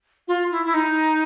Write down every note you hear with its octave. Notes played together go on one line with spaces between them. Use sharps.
F4
E4
E4
D#4